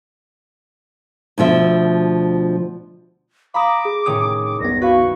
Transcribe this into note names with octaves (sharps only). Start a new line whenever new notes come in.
D2 B2 F3 E5
F5 A#5 B5 D6 D#6 A#6 E7
G#4
A2 C3 D#3 C#4 D#6
D6
C2 F#2 B3 A#6
E4 F#4 B4 F5 C#6